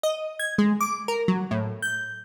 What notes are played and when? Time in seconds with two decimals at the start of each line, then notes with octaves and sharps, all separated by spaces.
0.03 D#5
0.39 G#6
0.58 G#3
0.81 D6
1.08 A#4
1.28 F#3
1.51 A2
1.82 G6